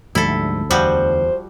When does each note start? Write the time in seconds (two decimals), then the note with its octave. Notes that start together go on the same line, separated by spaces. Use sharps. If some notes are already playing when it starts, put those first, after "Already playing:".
0.15 D2 G#2 F3 G3 E4 A4
0.71 E2 F3 G3 F#4 C5